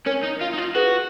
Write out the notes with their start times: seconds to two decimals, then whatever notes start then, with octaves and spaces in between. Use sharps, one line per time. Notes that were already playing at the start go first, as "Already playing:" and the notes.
0.06 C#4 A#4 C#5
0.23 D#4
0.41 F4
0.54 D#4
0.58 F4
0.75 F#4 G#4 B4